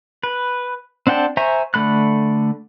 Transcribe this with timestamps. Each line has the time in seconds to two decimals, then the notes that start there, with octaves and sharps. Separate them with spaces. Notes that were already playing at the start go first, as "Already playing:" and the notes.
0.23 B4
1.07 C4 D4 F#5 G5 A5
1.37 C5 E5 G#5 A#5 C#6
1.74 D3 A3 B5 F#6